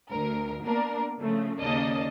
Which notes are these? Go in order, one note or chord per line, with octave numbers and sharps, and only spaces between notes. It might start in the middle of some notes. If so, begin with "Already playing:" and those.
D2 A#4
A#3 B3 D4 A#4
C#3 F3 A3
D#2 C#3 A#3 D5 D#5 A5